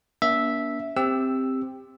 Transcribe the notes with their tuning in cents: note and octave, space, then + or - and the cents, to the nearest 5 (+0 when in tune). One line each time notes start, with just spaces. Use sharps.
A#3 +35 D4 -40 E5 -5
C4 +0 G4 +15 E6 +0